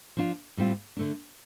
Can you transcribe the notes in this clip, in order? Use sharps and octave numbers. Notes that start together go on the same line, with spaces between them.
F3 D4 F4
A2 G3 C4 F4
D3 A3 D4